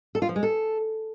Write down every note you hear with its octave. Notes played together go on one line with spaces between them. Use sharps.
A4
F4
F3
G#3
A4